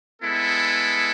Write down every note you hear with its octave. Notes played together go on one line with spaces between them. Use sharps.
G#3 B3 E4 A4